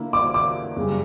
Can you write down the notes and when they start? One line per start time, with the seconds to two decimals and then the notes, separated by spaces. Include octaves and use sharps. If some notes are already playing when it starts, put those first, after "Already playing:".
Already playing: D3 A#3 E4
0.13 D6
0.34 D6
0.77 F#2 C#3 G3